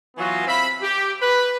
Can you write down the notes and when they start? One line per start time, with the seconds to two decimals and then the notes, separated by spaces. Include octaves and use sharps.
0.16 E3 F#3 B3 F4 F#4 G#5
0.46 C4 E5 F5 B5
0.81 G4
1.19 B4